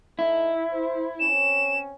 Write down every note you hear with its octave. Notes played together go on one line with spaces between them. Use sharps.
A3 D#4 E4
C5
C4 C#4 E7